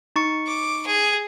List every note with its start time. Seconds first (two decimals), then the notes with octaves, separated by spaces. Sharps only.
0.16 D#4 C#6 C#7
0.47 D6
0.87 G#4